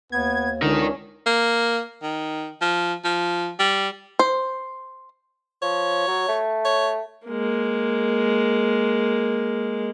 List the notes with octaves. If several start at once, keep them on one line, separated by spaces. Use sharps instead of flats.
D#2 B3 G#6
C#2 D3 C#4 D#4 A#4
A#3
D#3
F3
F3
G3
C5
F3 C#5
F#3
A3
C#5
G#3 A#3